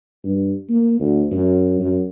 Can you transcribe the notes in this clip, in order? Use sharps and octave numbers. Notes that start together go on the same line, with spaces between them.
G2
A#3
D2
F#2
F#2